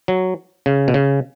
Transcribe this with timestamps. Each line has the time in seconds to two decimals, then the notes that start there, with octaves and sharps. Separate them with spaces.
0.08 F#3
0.66 C#3
0.88 B2
0.94 C#3